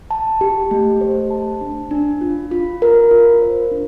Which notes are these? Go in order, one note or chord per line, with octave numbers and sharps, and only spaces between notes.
A5
G4
A3
C5
A5
D4
D4
F4
F4
A#4
F4
C5
D4